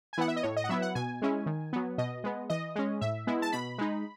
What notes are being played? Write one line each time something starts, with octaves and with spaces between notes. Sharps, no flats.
G#5
E3 B3 E4 F#5
E5
D#5
A2 C#5
D#5
F#5
F#3 B3 E4 E5
F#5
B2 G#5
G#3 C#4 E4
D#3
F#3 B3
B2 D#5
G#3 B3
E3 D#5
G#3 C#4
A2 E5
G#3 B3 E4
A5
B2 B5
G#3 D#4